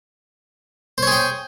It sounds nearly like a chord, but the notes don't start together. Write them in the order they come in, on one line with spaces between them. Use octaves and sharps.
C5 C#5 G#4 G5